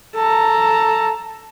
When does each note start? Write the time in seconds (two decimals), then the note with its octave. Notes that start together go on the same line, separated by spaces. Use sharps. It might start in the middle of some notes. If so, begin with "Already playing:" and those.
0.15 A4 A#5